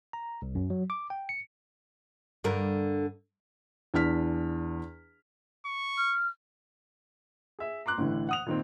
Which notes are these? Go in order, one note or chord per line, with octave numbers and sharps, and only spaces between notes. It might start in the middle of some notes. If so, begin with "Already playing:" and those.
A#5
C2
F#2
F#3
D6
G5
C#7
G2 D3 A#4
E2 D4 F6 B6
C#6
F6
G#4 E5
A#5 C6 D6 F#6
A1 A2 D3 E3
F#5 D#6 F7
A#2 D#3 C4